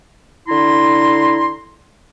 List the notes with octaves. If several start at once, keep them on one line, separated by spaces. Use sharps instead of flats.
D3 E4 A#5 C6